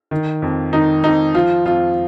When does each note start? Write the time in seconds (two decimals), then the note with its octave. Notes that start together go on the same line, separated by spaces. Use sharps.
0.11 D#3
0.42 F2
0.73 D#3 D#4
1.04 F2 D#4
1.34 F3 F4
1.66 F2 F4